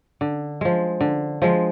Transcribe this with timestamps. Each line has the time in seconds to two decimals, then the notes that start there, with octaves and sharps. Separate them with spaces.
0.21 D3
0.61 F3 G#3
1.01 D3
1.42 F3 G#3